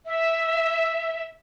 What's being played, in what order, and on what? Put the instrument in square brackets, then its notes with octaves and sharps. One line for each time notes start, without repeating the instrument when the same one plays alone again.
[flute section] E5